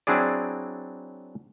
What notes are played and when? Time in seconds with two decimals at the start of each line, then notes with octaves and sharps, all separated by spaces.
0.07 F#3 C4 D4 E4 G#4 D5